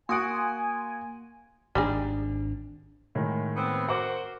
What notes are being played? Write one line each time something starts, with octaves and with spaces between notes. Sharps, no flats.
A#3 F#4 F#5 G#5 C6 D#6 D7
G#1 D#3 G3 D4 D#4 G#4
A2 D#3 G#3
B3 C4
F#4 A#4 C5 F#5 D6